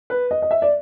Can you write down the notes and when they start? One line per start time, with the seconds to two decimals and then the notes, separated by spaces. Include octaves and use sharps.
0.10 B4
0.31 D#5
0.42 D#5
0.51 E5
0.62 D5